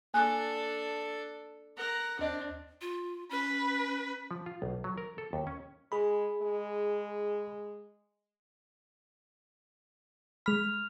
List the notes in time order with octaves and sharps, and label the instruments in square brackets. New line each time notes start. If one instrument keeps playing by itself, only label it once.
[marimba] A#3 G#5 F#6 [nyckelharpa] D4 A4
[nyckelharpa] A#4 F#5
[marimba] D#2 D#5 [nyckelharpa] C4 D4
[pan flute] F4
[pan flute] C#4 [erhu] B4
[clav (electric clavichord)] F3
F4
B1
F#3
A#4
A4
D#2
C#4
[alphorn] G#3 [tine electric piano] G#4 B5
[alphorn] G#3
[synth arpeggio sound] G#3 B5 [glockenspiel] F6 F7